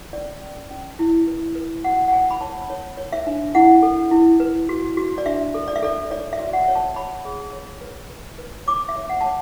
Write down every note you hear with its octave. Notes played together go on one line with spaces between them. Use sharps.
C#4 D5
C#4
C#4
E4
B4
B4
F#4 F#5
F#5
C#5 G#5
B5
C#5 A5
C#5
C#5
E5
D4
E4 F#5
A4
E4
B4
F#4
F#4
D5
D4 E5
A4
D5
E5
A4 D5
C#5 D5
E5
F#4
F#5
C#5
A5
C#5 B5
G#4
C#5
B4
B4
B4
C#5 D6
E5
C#5
F#5
C#5 A5